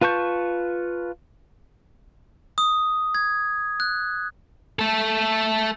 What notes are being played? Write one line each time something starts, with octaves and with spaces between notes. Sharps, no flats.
F4 B4 A5 C#6 G6
D#6
G#6
F#6
A3 A4